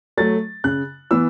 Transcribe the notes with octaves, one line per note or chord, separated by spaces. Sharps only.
F#3 A3 A6
C#3 F#6
E3 B3 E6